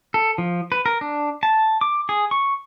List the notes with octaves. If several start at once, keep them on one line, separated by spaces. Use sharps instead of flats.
A4
F3
B4
A#4
D4
A5
D6
G#4
C#6